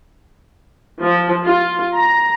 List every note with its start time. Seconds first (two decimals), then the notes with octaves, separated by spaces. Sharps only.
1.03 F3
1.46 F4
1.95 A#5